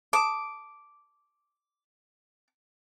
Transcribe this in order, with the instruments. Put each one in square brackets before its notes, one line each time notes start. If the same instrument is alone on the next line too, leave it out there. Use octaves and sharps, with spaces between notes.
[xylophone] A5 D#6 E7 [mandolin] D6